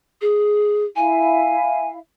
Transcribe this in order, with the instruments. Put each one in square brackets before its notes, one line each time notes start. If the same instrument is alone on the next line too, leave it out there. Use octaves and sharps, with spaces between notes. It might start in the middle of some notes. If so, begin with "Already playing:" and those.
[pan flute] G#4
[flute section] E4 E5 F5 [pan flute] G#5